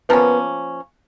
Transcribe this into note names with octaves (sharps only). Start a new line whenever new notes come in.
F3 A#3 B3 C#4